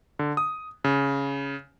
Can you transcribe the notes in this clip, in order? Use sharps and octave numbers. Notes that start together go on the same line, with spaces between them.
D3
D#6
C#3